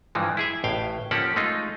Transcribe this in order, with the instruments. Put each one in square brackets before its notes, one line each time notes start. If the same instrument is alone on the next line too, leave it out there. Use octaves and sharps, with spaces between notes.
[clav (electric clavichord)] G2 E3 F3 G#3
E4 G#4 E5
A1 A2 F5 G5
F3 A#3 C#4 G4 A4 F#5
G#3 A3 D#4 F4